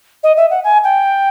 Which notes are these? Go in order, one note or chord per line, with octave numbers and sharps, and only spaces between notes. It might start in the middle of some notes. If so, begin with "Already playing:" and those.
D#5
E5
F#5
G#5
G5